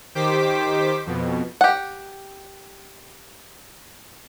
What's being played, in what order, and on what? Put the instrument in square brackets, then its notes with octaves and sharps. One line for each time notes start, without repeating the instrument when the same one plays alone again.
[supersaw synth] D#3 G4 C5 D6 B6
F2 B2
[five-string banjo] G4 F#5